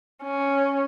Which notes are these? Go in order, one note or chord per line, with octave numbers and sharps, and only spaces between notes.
C#4